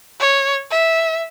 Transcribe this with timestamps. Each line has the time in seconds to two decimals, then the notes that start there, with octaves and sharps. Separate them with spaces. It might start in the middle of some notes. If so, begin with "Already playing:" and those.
0.20 C#5
0.70 E5